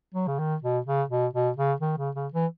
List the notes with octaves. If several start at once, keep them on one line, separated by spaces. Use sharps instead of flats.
F#3
C#3
D#3
B2
C#3
B2
B2
C#3
D#3
C#3
C#3
E3